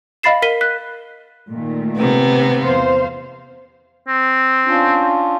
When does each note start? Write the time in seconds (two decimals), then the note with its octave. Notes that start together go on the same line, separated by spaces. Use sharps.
0.23 D#5 F5 B5 A6 C7 E7
0.42 A#4 B6 D#7 G7
0.61 F#6 B6
1.50 A#2 D#3 A3
1.96 C3 B3
2.62 E2 C5 F5
4.08 C4
4.66 C#4 D4 F4